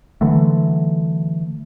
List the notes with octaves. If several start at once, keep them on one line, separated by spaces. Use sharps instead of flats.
D3 E3 F#3 A3